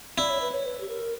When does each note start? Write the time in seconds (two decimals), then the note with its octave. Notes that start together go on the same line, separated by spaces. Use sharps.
0.18 E4 D5
0.30 C#5
0.41 B4
0.54 C#5
0.66 B4
0.81 G4
0.89 A#4